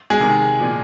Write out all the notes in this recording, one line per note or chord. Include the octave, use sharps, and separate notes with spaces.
G#3 G#4
C3 D#3
A#2 F3